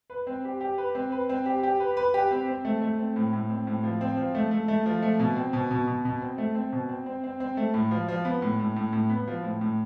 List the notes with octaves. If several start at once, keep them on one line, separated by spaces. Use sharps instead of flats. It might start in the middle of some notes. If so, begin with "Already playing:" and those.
B4
C4
G4
G4
B4
C4
B4
C4
G4
G4
B4
B4
G4
C4
C4
A3
A3
C4
A2
A2
C4
A2
F3
C4
F3
A3
A3
A3
F3
A3
B2
C4
B2
B2
B2
B2
C4
A3
C4
B2
C4
C4
C4
C4
A3
A2
F3
F3
B3
A2
A2
A2
A2
B3
F3
A2
A2